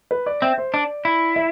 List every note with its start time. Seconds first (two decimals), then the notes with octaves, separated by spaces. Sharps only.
0.11 B4
0.26 D5
0.42 C4 E5
0.58 C5
0.74 D4 D5
1.05 E4
1.36 E5